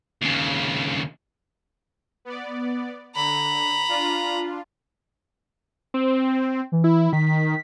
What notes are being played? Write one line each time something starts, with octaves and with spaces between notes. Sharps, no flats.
D#2 C#3
B3 D5
D3 A#5 B5
D4 F4
C4
E3
E4
D#3 B6